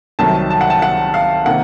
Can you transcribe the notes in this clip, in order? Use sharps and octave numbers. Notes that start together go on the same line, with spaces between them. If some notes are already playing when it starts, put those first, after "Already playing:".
C2 C3 D#3 F#3 A3 A5
A5
F#5
A5
F#5
F5
C3 D#3 A#3 F#5